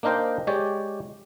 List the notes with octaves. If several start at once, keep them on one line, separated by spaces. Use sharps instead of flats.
A#3 D4 D#4 A#4 C5 G5
G#3 G4 C#5 D5